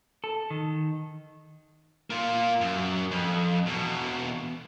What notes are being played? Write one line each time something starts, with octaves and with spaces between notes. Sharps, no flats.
A4
D#3
A#3 F4
F#2
F2
E2 B2